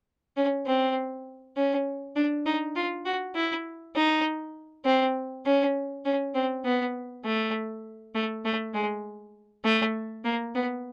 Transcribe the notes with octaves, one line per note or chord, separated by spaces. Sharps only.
C#4
C4
C#4
D4
D#4
F4
F#4
E4
D#4
C4
C#4
C#4
C4
B3
A3
A3
A3
G#3
A3
A#3
B3